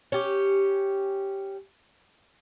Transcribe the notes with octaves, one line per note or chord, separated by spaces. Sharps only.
C#4 G4